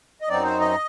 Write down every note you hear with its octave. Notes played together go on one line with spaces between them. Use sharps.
D#5
F#2 F#3 C4 D#4 D5
C5
D#5